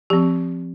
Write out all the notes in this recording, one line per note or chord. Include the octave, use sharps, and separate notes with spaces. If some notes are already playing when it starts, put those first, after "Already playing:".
F3 C4 G4